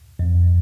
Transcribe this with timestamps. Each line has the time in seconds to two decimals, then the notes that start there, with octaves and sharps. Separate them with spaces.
0.19 F2